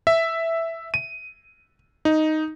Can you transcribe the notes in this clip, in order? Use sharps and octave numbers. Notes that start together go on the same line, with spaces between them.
E5
D#7
D#4